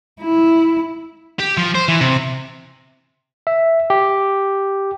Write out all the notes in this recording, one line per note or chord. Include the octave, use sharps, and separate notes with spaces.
E4
G4
F3
C5
E3
C3
E5
G4